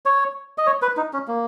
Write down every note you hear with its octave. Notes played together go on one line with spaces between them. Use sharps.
C#5
D#5
C#5
B4
D#4
C#4
A#3